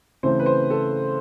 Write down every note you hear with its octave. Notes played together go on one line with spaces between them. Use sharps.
C#3 E3 A3 C4 C5
B4
C5
A4